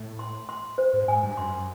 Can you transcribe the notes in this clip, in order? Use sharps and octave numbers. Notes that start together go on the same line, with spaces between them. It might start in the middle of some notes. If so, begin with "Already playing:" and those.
Already playing: A2
C6
C6
C5
G#2
G#2 G#5
G2
F#2 C6